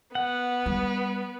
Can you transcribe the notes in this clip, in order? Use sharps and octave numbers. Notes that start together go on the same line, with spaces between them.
B3 F#5
G3